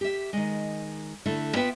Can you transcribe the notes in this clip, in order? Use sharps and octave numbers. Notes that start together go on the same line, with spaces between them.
G4 E5
D#3 G#3
D3 A3 E4
B3 F4 B4 E5 F#5 G5